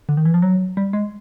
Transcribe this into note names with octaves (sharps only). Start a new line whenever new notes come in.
D3
D#3
E3
F3
F#3
G3
G#3